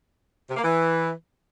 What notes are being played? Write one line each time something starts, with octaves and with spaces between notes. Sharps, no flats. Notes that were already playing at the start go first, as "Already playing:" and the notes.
C3
A#3
E3